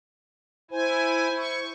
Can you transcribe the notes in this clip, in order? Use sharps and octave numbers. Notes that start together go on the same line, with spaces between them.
E4 C5 G#5
C#6